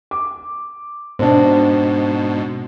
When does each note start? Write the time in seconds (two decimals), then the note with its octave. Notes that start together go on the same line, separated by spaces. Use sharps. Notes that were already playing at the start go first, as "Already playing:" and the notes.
0.11 D6
1.19 G#2 B2 C4 D4